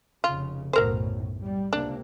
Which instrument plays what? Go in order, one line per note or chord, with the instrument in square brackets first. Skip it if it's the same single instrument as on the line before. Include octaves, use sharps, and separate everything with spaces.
[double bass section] F1 C#3 [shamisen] F4
[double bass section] B1 F#2 A2 [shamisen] F#3 A#4 C5
[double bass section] G3
[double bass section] C#2 C3 A#3 [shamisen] D4